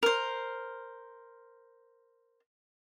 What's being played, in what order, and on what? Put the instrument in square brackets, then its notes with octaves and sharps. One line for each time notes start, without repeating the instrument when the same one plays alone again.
[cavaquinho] A#4 C5